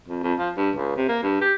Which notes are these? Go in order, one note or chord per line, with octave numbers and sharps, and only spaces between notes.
F2
F2
F3
G2
C#2
C3
A#3
G2
G4